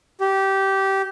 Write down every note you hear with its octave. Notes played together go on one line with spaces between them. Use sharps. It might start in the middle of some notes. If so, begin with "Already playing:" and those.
G4